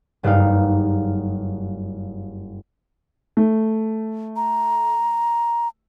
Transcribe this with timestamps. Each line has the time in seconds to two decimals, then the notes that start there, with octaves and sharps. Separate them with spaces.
0.23 F#1 G2 G3 D#4 F5
3.37 A3
4.36 A#5